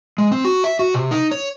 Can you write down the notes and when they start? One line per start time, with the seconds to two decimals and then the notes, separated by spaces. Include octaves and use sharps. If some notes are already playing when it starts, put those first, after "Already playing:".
0.18 G#3
0.32 C4
0.44 F#4
0.64 E5
0.79 F#4
0.94 C3
1.11 D#4
1.31 C#5